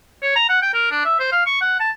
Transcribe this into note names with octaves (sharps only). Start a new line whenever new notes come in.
C#5
A#5
F#5
G5
A#4
D4
E5
C5
F5
C#6
F#5
A5